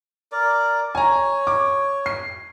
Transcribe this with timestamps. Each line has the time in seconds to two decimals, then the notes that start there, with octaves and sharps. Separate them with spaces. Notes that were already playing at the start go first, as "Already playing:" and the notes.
0.32 A#4 D5
0.95 C#5 G#5 A#5
1.47 D6
2.06 C7